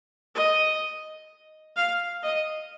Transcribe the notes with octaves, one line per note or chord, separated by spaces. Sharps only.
D#5
F5
D#5